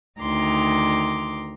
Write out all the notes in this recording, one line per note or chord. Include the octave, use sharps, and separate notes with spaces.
D2 D#3 A#5 C6 D6